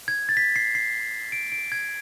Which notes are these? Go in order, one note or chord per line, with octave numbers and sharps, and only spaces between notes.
G#6
A6
B6
C7
C7
D7
D7
G#6